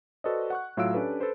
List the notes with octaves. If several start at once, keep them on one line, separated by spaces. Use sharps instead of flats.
F#4 A4 B4 C5 D5 D#5
F#5 C#6 F#6
A2 F#3 F4 F5 E6 D7
C#4 D4 G4 A4 B4
A4 B4 C5